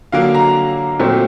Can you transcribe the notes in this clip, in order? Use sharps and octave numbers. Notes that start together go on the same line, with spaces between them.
D3 F#3 A#3 F5
A#5
A#2 F#3 A3 C4